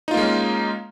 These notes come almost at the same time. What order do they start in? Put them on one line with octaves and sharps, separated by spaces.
D#4 F4 A#3 G#3 C#4